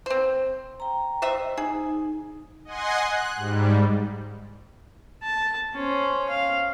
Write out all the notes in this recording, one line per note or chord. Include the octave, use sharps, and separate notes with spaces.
C4 C5
G5 A#5
C5 D#5 E5
D#4 G#4
D#5 F#5 G#5 C6
F#6
G#2 G3
A5
C#4 C5
F5